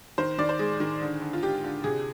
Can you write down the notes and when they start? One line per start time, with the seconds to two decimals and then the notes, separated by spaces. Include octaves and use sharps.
0.18 D#3 C5
0.38 D#3 D5
0.49 C5
0.59 G#3 G#4
0.80 D#3
1.01 D3
1.22 D3
1.33 F4
1.43 D3 G4
1.64 D3
1.84 C3 G#4